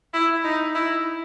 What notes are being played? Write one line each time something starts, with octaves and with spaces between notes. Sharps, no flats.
E4
D#4
E4